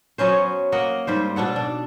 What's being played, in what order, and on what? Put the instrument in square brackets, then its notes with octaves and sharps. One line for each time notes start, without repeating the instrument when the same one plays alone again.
[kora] F#3 B3 C#4 C5
A#3 D#5 F#5
G#2 G3 C5
B2 D4 A4 F#5
D4